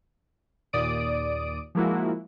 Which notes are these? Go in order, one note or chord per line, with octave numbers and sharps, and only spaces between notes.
D#2 A#2 D5 D#6 D7
F3 G#3 A#3 E4 F#4